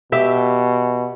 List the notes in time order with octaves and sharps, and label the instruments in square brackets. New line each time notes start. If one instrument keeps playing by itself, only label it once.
[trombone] B2 [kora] G4 E5 G5